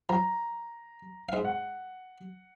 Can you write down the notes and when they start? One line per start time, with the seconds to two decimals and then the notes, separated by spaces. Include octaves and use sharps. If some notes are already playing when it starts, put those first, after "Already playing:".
0.09 F3 A#5
1.29 G#2 F5
1.45 F#5